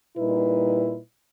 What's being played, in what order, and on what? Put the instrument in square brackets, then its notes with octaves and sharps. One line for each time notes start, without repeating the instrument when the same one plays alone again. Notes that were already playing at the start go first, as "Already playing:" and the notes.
[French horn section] A#2 G3 D#4 E4 B4